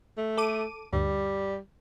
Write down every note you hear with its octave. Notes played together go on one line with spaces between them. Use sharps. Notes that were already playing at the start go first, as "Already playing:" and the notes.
A3
A4 D6 D#7
D2 G2 G3